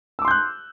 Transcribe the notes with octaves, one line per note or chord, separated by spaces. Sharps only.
C6 D6 E6 F#6 G6